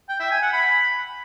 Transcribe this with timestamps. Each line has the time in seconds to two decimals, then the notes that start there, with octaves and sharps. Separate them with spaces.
0.09 G5
0.20 E5
0.31 G#5
0.42 F#5
0.53 B5